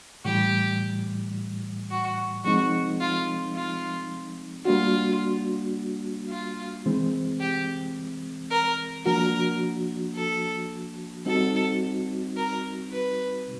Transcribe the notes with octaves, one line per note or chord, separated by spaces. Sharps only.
A2 E3 G3 G4
F#4
F3 G#3 C4 D#4 F#4
F4
F4
G3 A#3 D4 F4 F#4
F4
E3 G#3 C4
G4
A#4
F3 A#3 D4 F#4 A#4
A4
G3 C4 D#4 F#4 A4
A#4
B4